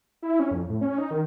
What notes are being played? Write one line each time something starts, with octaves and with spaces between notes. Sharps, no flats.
E4
C#4
F2
A2
C#4
D#4
D#3